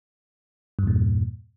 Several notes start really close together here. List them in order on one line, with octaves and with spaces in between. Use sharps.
G2 E2 A#2